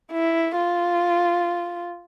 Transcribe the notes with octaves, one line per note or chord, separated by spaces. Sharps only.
E4
F4